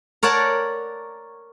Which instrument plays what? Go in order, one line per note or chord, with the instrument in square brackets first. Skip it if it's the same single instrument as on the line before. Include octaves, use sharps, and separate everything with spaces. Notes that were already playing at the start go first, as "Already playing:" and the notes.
[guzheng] A#4 C#5 D5 F#5 A5